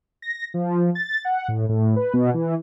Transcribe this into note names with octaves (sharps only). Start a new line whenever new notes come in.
A#6
F3
A6
F#5
A2
A2
B4
B2
E3